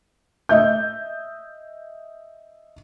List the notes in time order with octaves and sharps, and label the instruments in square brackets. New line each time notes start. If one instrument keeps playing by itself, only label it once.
[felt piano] D#5 E5 G6